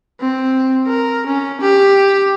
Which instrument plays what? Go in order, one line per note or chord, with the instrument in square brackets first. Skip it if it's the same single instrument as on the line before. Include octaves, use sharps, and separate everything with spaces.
[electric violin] C4
A#4
C#4
G4